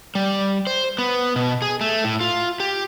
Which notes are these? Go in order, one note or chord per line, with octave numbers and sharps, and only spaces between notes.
G3
C5
B3
B2
G#4
A3
A2
F4
G4